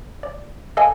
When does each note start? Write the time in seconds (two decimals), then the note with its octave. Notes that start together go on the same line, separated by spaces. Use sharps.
0.23 D5
0.77 A4 D#5 F5 G#5